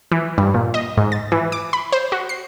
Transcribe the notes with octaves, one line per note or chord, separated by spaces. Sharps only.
E3
G2
A#2
D#5
G#2
A6
E3
D6
B5
C5
F#4
C7